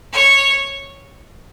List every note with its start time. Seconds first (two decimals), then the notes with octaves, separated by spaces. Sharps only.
0.13 C#5